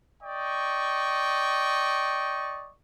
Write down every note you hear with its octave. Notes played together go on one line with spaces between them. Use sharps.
D5 D#5 G5 C#6